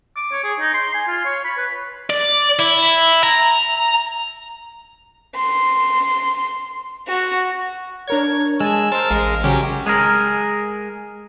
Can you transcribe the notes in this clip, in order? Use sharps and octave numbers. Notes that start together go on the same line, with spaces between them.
D6
C#5
G#4
D#4
C6
G#5
F4
C#5
B5
B4
D5
E4
A#5
C6
F#4
D4 A#4 C#5 G#6
G#3 G#5 A5 E6
A#4 C5 A5 E6
A1 G#3 F5 A#6
C#3 F#3 C#4 G4
G#3 G#4 A#4